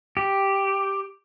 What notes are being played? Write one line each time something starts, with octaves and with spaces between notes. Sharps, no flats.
G4